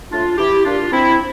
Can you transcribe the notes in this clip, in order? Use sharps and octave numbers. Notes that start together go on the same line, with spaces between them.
A2 D4 F4
E3 E4 G4
A#2 D4 F4
C4 E4